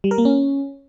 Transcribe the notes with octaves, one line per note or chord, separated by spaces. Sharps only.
G3
A#4
A#3
C#4